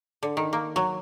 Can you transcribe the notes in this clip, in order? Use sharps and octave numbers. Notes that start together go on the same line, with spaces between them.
D3
D#3
A#3
F#3